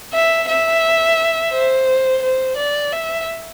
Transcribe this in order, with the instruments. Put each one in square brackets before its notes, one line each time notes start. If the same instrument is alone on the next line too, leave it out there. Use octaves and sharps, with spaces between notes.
[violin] E5
E5
C5
C5
D5
E5